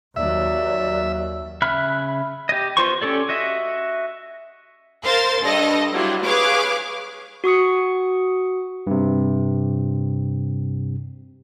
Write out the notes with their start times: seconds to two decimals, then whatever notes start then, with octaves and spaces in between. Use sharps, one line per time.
0.16 D#2 F#3 D5 E5
1.62 C#3 E5 B5 F6 F#6
2.49 G4 D#5
2.77 B3 F4 C5 C6 C#6
3.02 C#4 G4 A4 D5
3.29 F#4 D#5 E5
5.03 A#4 C5 F5 C6 A6
5.42 G2 A4 D#5 A#6
5.93 F#3 G3 E4 F4
6.24 G#4 B4 C#5 F5 D6
7.44 F#4 C#6 D#6 C#7
8.87 G2 C3